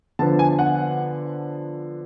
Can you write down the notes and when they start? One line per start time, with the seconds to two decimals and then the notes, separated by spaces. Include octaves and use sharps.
0.19 D3 F3 B3 D4 A5
0.39 G#5
0.59 F#5